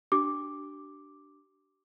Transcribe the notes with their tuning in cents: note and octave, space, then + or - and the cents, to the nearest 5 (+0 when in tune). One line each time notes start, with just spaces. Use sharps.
D4 +0 G4 -35 D6 +0